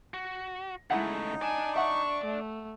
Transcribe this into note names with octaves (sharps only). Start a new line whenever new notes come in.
F#4
C#3 G#3 A3 D#4 E4 F#5
D5 G#5 A5
E5 F#5 C#6
A3